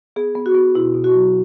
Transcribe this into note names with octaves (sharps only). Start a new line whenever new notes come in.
B3 G#4
B3
F#4
B3
B2 E4
B2
F#4
F#3